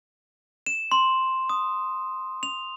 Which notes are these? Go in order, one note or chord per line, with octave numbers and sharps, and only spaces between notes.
E7
C6
D#6
F7